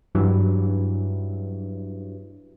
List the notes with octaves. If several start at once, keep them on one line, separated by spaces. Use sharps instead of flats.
G2 E3 F#3